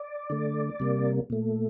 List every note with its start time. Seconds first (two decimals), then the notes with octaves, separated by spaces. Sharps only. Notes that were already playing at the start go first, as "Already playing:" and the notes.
Already playing: D5
0.30 D3 A3
0.80 C3 G3 A#3
1.30 A#2 A3